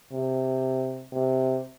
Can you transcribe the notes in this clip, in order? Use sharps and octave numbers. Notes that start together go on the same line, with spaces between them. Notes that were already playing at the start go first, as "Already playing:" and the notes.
C3
C3